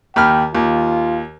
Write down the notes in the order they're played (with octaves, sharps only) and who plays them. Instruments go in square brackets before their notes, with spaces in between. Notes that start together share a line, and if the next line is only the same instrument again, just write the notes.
[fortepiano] D#2 B5 F6 [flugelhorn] G5
[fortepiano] D#2 [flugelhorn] F4